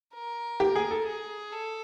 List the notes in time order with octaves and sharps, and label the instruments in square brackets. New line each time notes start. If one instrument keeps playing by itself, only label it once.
[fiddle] A#4
[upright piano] G4
G#4
A4
[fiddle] G#4
A4